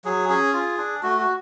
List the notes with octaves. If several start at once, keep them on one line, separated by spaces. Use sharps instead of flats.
F#3 G#4
C#4 G#4
F4
D4
A3 F#4
F#4